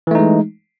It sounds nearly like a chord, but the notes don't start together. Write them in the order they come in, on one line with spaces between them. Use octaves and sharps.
E3 A3 D#4 G#3